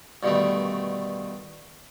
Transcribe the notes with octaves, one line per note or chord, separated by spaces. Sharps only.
G2 B2 D3 D#3 A3